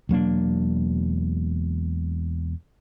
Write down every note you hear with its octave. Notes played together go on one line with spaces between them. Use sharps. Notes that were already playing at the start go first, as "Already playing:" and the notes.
E1 F#3 A#3 D4